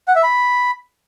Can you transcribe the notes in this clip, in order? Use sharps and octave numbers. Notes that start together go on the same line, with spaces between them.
F#5
E5
B5